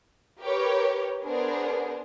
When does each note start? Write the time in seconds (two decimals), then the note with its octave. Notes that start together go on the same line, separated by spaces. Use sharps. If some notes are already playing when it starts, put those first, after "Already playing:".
0.40 G4 A#4 B4 C#5
1.23 B3 D4 G#4 A#4 C5